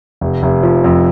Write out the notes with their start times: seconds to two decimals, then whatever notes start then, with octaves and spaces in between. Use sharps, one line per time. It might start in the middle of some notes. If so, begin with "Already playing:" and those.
0.21 F1
0.43 F1
0.63 F3
0.84 F2